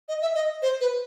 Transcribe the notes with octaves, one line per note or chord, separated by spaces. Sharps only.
D#5
E5
D#5
C5
B4